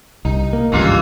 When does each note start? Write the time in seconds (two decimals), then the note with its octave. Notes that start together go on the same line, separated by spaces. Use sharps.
0.25 C2 D#4
0.53 A#3
0.72 G#1 C#2 G2 E3 A#3 F4